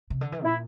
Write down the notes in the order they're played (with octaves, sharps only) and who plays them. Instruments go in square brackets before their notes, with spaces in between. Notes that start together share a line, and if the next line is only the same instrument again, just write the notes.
[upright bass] C3
D3
E3
[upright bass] A#2 [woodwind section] E4